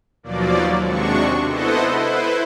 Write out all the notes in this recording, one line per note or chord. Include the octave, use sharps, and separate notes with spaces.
D#2 B2 F3 F#3 A#3 D5
D#2 C3 G#3 D4 F#4 C#6
B3 E4 A4 C5 D#5 F#5
E4 B4 C5